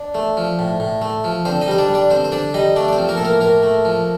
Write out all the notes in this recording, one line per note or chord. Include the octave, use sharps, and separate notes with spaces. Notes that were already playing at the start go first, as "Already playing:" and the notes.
Already playing: D4 D5
A3
F3
A2
A2
A3
F3
D3 C4 C5
D#4 D#5
G3 C5
D4 D5
G3
D4 D5
D3 C4 C5
C5
D3 D4 D5
G3 D#4 D#5
A3 D4 D5
D5
C4 C5
F3
A#3 A#4
A2 A4
A#3 A#4
A2 A#3 A#4
A3
F3